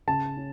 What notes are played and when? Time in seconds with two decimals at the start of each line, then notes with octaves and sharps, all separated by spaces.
0.07 C#3 A5
0.37 C#4